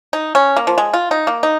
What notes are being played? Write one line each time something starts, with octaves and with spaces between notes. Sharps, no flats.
D#4
C#4
A#3
F3
G#3
F4
D#4
A#3
D#4